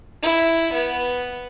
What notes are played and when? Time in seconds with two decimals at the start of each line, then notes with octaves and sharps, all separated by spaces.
0.23 E4
0.74 B3